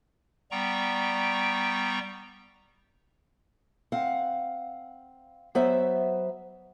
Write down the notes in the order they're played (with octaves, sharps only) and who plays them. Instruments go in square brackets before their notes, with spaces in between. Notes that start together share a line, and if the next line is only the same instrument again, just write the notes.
[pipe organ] G3 B3 G5 A#5 C#6
[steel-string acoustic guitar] C4 F5 F#5
F#3 B3 C5 E5